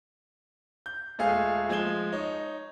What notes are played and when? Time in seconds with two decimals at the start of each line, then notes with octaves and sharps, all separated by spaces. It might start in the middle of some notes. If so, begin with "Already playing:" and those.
0.86 G6
1.19 D#1 G#3 A3 G#4 F5
1.69 F3 G#3 G#6 E7 G7
2.12 D#4 C#5